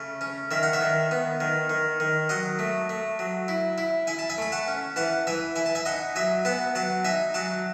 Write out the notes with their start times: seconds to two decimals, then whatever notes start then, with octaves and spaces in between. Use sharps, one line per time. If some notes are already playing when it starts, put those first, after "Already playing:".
Already playing: C#3 A3
0.21 C#4
0.51 D#3 E5
0.63 F#5
0.73 C#5 E5
0.81 D#3
1.11 B3
1.40 D#3
1.70 D#3
2.00 D#3
2.29 F#3 D#5 F#5
2.59 A3
2.89 A3
3.19 F#3
3.48 E4
3.78 E4
4.07 E4 G#5
4.19 A5
4.30 E5 G#5
4.38 A3 B5
4.52 F#5 A5
4.68 C#4
4.96 E3 F#5 A5
5.27 E3 E5 G#5
5.56 E4 G#5
5.66 A5
5.75 E5 G#5
5.85 D#4 D#5 F#5
6.16 F#3 E5 G#5
6.45 B3 F#5 A5
6.75 F#3 F#5 A5
7.05 D#4 E5 G#5
7.34 F#3 F#5 A5